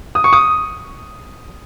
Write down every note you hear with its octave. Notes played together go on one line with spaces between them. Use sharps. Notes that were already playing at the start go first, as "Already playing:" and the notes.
D#6
C#6
D#6